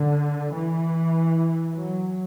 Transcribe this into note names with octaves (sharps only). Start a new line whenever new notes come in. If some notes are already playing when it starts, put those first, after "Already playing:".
Already playing: D3
E3
F#3